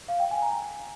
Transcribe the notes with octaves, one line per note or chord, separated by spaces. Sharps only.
F5
G5
G#5
A#5